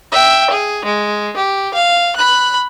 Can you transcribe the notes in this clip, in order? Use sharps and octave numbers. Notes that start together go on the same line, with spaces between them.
E5 G5
G#4
G#3
G4
F5
B5 F#6